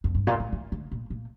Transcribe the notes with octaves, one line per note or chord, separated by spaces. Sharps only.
F2
G2
A#2
A2
E3
D3
A#2
A#2